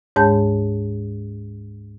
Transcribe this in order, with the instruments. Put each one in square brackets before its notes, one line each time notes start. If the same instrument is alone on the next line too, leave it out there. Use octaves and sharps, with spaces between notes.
[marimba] D2 G#2 G#3 C#5 A5 G6